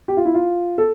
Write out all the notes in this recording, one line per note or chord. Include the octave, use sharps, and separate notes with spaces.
G4
F4
E4
F4
A4